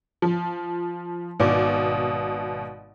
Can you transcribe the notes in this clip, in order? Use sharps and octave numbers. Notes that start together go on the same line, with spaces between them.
F3
G#1 B2 D6